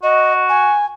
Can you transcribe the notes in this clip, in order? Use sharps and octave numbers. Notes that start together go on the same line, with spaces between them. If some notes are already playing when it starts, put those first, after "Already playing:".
F#4 D#5
G#5